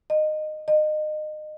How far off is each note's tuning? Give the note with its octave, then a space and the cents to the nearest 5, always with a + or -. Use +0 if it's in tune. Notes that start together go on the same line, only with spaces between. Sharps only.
D#5 -20
D#5 -30